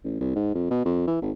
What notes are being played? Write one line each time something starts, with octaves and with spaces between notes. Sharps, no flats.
A1
C2
G#2
F2
B2
F2
E3
G#1